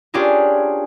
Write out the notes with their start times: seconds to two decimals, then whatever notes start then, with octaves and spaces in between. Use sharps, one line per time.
0.14 C#4 D4 F4 G4 G#4 A#4